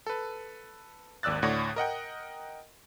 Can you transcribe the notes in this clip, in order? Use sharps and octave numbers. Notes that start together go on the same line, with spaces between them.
A4 B4
G#1 D#2 D5 E6 F#6 A6
D2 A2 C#5 D5 F#5 A#6
A#4 D#5 F#5 G5